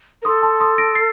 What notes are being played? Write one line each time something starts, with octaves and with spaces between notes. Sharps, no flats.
A#4
A4 C6 D#6
A5 C6
C6 D#6
A#6 D7
A6 C7